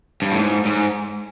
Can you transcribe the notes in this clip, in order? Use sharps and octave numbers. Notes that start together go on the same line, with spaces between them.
G2
A2
G#2
G#2